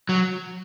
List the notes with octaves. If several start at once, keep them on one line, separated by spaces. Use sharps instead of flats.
F#3